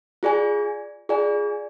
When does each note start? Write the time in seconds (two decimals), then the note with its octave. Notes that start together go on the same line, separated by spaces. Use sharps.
0.23 F4 G#4 D5 G#5
1.09 F4 G#4 D5 G#5